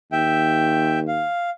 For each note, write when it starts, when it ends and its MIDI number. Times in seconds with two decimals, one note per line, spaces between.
0.12 1.25 39
0.12 0.99 76
0.12 0.99 79
1.08 1.50 77